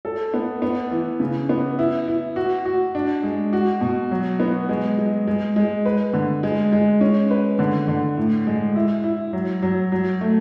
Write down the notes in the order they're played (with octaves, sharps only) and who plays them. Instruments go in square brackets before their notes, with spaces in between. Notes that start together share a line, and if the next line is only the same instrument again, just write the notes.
[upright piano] A4
B3
B3
E3
C#3
B3
E4
E4
F#4
F#4
D4
G#3
F#4
B2
F#3
B3
G#3
G#3
G#3
G#3
B4
D3
G#3
G#3
C#4
B4
D3
D3
A2
G#3
E4
E4
F#3
F#3
F#3
A3